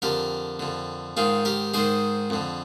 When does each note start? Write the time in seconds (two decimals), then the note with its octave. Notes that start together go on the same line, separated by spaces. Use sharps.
0.02 F2 D3 G4 A#4
0.59 F2 D3
1.17 G#2 D#3 F4 G#4
1.45 G4 A#4
1.74 G#2 D#3 G#4 C5
2.30 F2 D3